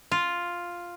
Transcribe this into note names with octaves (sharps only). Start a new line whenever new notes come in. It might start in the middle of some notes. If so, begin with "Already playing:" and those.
F4